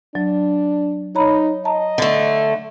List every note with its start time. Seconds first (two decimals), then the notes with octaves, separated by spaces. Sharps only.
0.15 F#3 D4
1.15 D#4 C#5 A#5 B5
1.65 D#5 A5 A#5
1.98 D3 A3